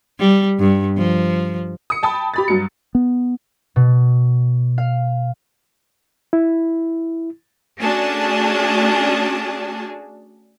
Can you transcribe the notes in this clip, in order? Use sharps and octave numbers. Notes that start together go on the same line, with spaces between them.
G3
G2
F3
D#6 C#7
G5 A5 B5 D#6
G4 B5 A6
G2 F#3 C#7
B3
B2
F5
E4
A3 C#4 D4 F#4 G#4 A5